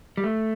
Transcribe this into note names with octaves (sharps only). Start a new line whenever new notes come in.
G3
A3